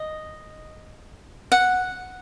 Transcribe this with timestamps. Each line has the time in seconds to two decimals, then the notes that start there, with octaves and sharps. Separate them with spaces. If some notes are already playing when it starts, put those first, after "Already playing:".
Already playing: D#5
1.52 F#5